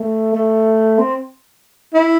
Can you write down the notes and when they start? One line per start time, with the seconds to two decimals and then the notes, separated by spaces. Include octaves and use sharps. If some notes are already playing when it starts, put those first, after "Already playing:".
Already playing: A3
0.34 A3
0.99 C4
1.94 E4